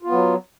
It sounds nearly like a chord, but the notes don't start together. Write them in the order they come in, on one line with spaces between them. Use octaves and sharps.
F4 B3 F#3